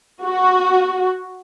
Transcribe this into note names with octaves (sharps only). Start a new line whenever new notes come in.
F#4